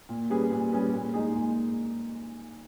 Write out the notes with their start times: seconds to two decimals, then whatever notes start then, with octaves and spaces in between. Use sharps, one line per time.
0.09 A#2
0.30 G3 C#4 G#4 B4
0.51 A#2
0.72 G3 C#4 G#4 B4
0.93 A#2
1.14 G#3 D#4 G#4
1.35 A#2